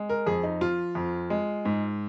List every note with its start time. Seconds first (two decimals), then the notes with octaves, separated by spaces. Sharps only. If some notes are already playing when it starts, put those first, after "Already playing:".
Already playing: G#3
0.09 A#4
0.26 F2 G#4
0.43 D#4
0.61 F3 F4
0.95 F2
1.30 G#3
1.65 G#2